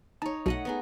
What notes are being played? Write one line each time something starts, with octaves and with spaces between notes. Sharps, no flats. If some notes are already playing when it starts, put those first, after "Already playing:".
D#4 C#5 A5
B1 B2 A3 D#5 F#5
B3 D#4 G#4